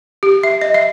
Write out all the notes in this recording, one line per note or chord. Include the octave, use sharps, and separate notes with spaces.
G4
E5
D#5
E5